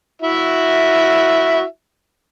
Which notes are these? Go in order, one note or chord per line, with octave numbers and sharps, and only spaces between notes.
E4 F#4 E5